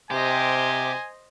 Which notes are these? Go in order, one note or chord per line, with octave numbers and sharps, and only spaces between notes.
C3 G4 C5 D#5 G#5